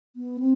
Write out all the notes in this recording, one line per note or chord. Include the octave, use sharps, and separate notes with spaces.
B3
C4